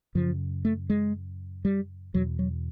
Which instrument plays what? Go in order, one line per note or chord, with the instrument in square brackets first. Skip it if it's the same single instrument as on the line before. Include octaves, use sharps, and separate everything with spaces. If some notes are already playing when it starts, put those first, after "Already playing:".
[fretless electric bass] F#2 C#3 F3
A3
G#3
G3
E2 B2 F#3
F#3